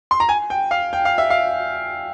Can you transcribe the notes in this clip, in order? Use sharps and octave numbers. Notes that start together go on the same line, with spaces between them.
C6
A#5
G#5
G5
F5
G5
F5
E5
F5